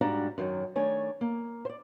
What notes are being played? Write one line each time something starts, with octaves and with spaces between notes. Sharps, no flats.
G#2 G3 D4 F#4 F5 A#5
F#2 D#3 E3 F#3
D#3 A3 D4 C#5 G#5
A#3
C5 D5